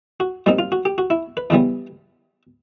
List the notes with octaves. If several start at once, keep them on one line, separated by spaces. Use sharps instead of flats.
F#4
A#2 G3 C4 D#4
F4
F#4
G4
F#4
E4
B4
E2 C#3 E3 G3 B3